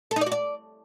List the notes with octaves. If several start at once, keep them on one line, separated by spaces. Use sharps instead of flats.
A4
D#4
D5
F#4
D5